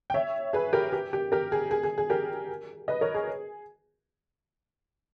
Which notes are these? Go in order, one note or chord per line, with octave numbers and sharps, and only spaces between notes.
G5
C#5 E5
G#4 B4
G4 A#4
G4
G4
G4 A#4
G#4
G#4
G#4
G#4
G4 A#4
B4 D#5
A#4 C#5
G#4